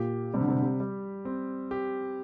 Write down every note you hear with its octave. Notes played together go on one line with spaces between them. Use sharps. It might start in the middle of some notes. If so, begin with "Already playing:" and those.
Already playing: A#2 G4
C3 G3
D3
C3
D3
C3
G3
C4
G4